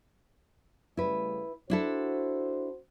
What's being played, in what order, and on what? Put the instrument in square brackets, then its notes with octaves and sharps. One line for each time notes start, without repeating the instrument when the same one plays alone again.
[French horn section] C#3 G3 A3 [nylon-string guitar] E4 B4
[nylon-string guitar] D4 E4 A4 [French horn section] F#4 C5